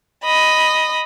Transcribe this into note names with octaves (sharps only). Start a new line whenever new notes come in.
D#5 B5